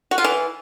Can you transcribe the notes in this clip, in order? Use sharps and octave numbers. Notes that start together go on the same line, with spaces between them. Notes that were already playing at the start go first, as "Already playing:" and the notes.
F#4
F4
E3